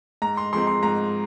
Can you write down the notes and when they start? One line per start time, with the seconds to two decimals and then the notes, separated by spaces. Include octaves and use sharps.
0.22 G#2 A#5
0.37 C6
0.53 F3 G#3 C4 C6
0.67 C6
0.83 G#2 A#5